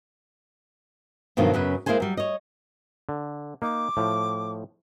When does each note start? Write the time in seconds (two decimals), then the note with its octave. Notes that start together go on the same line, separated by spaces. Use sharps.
1.37 G2 B2 D#3 F3 F#3 A3
1.54 F#2 C#3 C#4 B4
1.86 G#3 A#3 E4 G#4 C5 G#5
2.00 F#3 G3
2.17 C#5 D#5
3.09 D3
3.62 A#3 D#4 D6
3.97 A2 F3